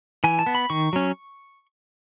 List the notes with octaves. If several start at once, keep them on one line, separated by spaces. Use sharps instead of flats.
E3 G#5
A5
B3
B5
D#3 C#6
F#3 C#4